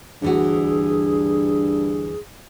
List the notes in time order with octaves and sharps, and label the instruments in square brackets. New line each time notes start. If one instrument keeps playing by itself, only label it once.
[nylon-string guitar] D2 E3 F#4 [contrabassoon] G2 [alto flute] G#4